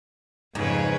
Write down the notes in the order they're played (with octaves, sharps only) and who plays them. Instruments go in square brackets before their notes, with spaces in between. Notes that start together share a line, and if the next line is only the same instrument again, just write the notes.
[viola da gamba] F2 C#3 B4 [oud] G#2